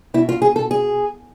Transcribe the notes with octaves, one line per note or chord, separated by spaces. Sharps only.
B2 E4
F4
G#4
A4
G#4